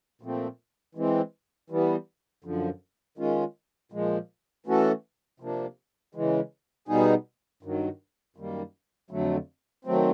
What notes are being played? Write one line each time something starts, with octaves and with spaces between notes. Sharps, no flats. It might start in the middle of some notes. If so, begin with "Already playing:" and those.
A#2 F3 A3 C4
E3 G#3 C4
E3 G3 B3
F#2 D3 F3
D#3 G#3 C#4 F4
A#2 F3 G#3
E3 A3 C#4 F#4 A4
C3 F3 A#3 D4
C#3 E3 G#3
B2 G3 B3 D#4 G#4
G2 D#3 F#3
F#2 D#3 G3 A#3
F2 D3 F#3 A3
D#3 F#3 A3 C4